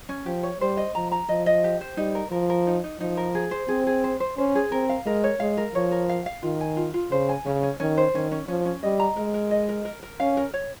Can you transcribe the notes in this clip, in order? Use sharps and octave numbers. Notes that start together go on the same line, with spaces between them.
C#4
F3 G4
C#5
G3 C5
D#5
F3 A#5
A#5
F3 D#5
D#5
G4
C5
G3 D#4
A#4
F3 A#4
A#4
D#4
D#4
F3 D#4
A#4
G#4
C5
C4 G#4
G#4
C5
C5
C#4 C5
G#4
C4 A#4
F5
G#3 A#4
C#5
G#3 F5
A#4
F3 C#5
A#4
F5
F5
D#3 F4
G#5
F4
F4
C#3 C5
G#5
C#3 C#4
C#4
D#3 C#4
C5
D#3 C#4
C#4
F3 C#4
C#4
G3 D#5
A#5
G#3 A#4
A#4
D#5
A#4
A#4
A#4
C#4 F5
A#4
C#5